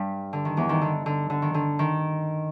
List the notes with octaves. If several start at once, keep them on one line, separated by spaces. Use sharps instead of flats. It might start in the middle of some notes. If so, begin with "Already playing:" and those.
Already playing: G2 G3
D3
D#3
E2 E3
D#3
D3
D3
D3
D#3
D3
D#3